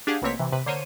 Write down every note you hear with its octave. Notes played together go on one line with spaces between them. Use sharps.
D4 G4 G#4 F5 F#5
A1 B2 A#3 C4 C#5 B6
C3 E3
C3 B4
D3 A#3 C5 C#5 D#7